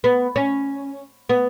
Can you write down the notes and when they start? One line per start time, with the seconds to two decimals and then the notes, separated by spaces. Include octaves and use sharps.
0.04 B3
0.36 C#4
1.29 B3